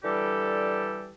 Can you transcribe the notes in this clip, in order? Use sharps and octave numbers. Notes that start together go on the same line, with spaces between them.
D3 E3 G3 G4 A4